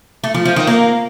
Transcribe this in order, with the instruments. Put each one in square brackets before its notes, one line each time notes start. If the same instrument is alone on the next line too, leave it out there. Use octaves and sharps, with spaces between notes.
[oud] A3
F3
F3
D#3
A#3